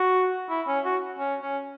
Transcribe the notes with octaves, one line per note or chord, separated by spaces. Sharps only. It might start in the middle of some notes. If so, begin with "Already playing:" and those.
Already playing: F#4
E4
C#4
F#4
C#4
C#4